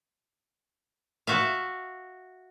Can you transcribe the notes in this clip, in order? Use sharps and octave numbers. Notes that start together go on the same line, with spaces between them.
F#4 E5 F5